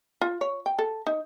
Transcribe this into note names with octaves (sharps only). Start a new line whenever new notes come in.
F4
C#5
G5
A4
D#4